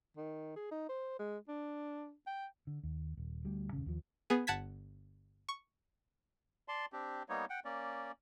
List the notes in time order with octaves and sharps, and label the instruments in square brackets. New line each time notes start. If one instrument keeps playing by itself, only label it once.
[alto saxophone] D#3
G#4
D#4
C5
G#3
D4
G5
[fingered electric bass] D3
D#2
D#1
D2 G3
D#1 C#2 C#3
D#2 F3
[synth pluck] B3 G#4
G1 F#5 A5 G#6 B6
C#6
[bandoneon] D5 A5 C6
C4 D4 G4
G3 A#3 B3 D#4 C#5
F#5 G5
A#3 C#4 D5